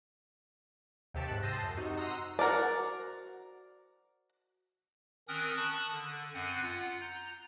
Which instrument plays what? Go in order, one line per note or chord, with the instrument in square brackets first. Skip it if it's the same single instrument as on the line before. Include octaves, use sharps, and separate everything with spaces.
[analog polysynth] D#2 C3 G4 A5 C#6
G#2 F#6
A5 C6 D#6 E6 G6 A#6
F#2
C3 D#4 F#4
F#5 A#5 C6 D#6 E6
[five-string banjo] F#4 A#4 C5 D5
[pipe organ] D#3 C4 C#4 A#4 D#6 F#6
A5 B5 C#6 D#6 F#6
D3
F#2 C4 F#5 G#5 F#6 G6
F4 F#5
A#5 G6